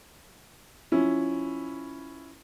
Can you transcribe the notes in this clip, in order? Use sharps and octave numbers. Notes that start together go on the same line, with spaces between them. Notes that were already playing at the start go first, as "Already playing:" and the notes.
F3 C#4 E4